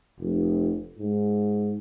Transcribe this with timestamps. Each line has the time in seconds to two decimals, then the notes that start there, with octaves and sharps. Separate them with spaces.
0.19 F1
0.98 G#2